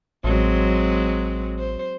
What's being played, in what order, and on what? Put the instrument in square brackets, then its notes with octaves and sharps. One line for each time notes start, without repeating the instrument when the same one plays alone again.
[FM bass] A1 [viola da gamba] F#3 G#3 C4
[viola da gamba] C5